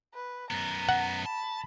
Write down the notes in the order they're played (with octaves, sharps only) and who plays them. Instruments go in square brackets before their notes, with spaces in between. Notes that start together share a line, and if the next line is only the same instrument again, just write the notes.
[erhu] B4
[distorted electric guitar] F#2 B3 [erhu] A#5
[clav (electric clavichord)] F#5
[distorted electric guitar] A5 [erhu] B5